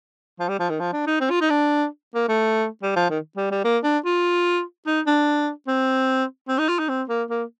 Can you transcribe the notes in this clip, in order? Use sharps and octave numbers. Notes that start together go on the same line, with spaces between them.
F3
G3
F3
D#3
F3
D4
D#4
C4
F4
D#4
D4
A#3
A3
G3
F3
D#3
G3
G3
A#3
D4
F4
D#4
D4
C4
C4
D#4
F4
D#4
C4
A#3
A#3